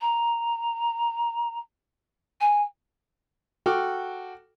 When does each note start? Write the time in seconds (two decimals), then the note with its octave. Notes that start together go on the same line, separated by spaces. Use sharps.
0.01 A#5
2.41 G#5
3.66 F#4 A4 G5 D6 F6